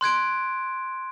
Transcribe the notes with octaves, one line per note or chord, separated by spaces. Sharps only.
C6 F#6 G#6 D7